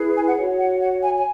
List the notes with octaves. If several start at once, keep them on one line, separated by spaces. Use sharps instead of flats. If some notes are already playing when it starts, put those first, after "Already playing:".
Already playing: E4 G#4 B4
G#5
F#5
F#4 C#5
F#5
F#5
G#5
G#5